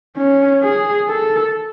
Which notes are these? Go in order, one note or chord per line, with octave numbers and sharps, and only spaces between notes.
C#4
G#4
A4